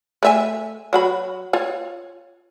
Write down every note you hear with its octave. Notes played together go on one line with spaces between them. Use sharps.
A3 E5 G#5
F#3 F#4 B5
F4 C#5